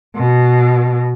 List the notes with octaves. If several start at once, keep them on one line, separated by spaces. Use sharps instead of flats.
B2